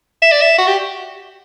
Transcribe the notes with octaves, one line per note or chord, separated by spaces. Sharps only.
E5
D5
E5
F#4
G4